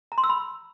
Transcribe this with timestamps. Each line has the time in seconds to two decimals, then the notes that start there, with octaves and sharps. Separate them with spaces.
0.12 A#5
0.18 C6
0.24 E6
0.29 B5